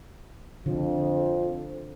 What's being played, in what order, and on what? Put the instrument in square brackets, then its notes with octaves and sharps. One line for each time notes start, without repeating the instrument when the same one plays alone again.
[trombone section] F2 F3 [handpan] D3